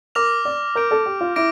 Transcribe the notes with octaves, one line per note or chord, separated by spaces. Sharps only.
A#4 D6 F6 A#6 F7
D5
A#4 G6 D7 F7
A4
G4
F4
E4 D6 A#6 D7